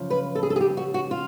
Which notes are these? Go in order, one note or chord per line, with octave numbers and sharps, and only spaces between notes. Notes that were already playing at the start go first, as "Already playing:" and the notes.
Already playing: F#2 C#3 F3
B4
A4
G#4
A4
G#4
G4
F#4
F#4
F4